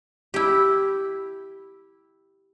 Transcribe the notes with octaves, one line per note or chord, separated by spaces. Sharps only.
E4 G4